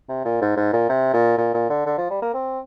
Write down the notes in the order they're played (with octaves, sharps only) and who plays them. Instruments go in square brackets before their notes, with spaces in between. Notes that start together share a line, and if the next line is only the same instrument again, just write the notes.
[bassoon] C3
A#2
G#2
G#2
A#2
C3
A#2
A#2
A#2
D3
D3
F3
G3
A#3
C4